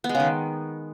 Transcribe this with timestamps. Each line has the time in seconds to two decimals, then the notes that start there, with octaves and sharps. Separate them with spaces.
0.04 B3
0.09 G#3
0.15 C#3
0.20 D#3